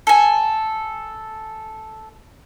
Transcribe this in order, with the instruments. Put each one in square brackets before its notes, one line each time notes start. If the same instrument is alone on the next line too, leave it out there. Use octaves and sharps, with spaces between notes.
[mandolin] A4 G#5